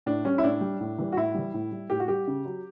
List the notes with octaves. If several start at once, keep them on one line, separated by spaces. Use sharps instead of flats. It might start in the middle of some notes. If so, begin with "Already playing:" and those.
A2 D4
G3 C#4
E4
A2 D4
G3
A2
E3 G3
F#4
A2 E4
E3 G3
A2
G3
A2 G4
F#4
G3 G4
C#3
F#3